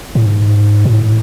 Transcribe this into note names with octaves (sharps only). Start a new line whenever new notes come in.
A2
G#2
A#2
A2